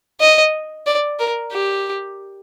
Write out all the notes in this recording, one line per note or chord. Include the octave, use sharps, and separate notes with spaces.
D#5
D5
A#4
G4